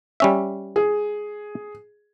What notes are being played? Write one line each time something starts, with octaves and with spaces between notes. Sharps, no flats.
G3 C#4 E5
G#4